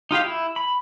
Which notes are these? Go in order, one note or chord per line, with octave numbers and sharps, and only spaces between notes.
D#4 F4 G4 F5
E4
B5